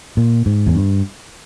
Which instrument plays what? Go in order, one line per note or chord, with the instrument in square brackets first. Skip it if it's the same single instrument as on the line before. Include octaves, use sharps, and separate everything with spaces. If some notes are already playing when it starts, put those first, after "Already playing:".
[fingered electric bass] A#2
G#2
E2
G2